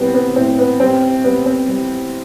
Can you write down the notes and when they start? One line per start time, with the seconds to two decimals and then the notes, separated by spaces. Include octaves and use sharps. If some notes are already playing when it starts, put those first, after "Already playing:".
Already playing: E3 G3 B3 C4
0.14 B3
0.36 A2 C4
0.59 B3
0.80 G3 C4
1.24 G3 B3
1.46 C4
1.68 G3